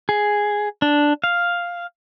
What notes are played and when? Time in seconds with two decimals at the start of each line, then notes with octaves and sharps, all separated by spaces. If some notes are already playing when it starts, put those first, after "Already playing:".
0.09 G#4
0.82 D4
1.24 F5